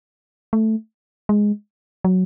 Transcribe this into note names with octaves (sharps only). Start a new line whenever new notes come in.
A3
G#3
F#3